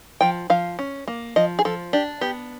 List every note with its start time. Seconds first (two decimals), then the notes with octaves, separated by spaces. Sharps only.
0.21 F3 G5
0.50 F3 F5
0.79 C#4
1.08 A#3
1.36 F3 D#5
1.59 G#4
1.65 F3 A4
1.93 D4 G4
2.21 B3 G4